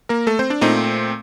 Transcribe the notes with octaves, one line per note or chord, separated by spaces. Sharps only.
A#3 A#4
A3 A4
C4 C5
D4 D5
A#2 A3 C4 D#4 D#5